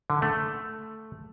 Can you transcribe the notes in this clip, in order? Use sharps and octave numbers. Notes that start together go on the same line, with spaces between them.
D3
A3